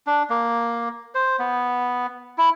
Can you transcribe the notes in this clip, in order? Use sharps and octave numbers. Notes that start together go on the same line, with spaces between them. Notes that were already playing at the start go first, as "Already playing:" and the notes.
D4
A#3
C5
B3
E4